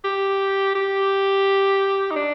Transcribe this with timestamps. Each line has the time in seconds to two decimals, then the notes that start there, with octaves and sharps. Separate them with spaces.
0.04 G4
0.75 G4
2.11 D#4
2.16 D4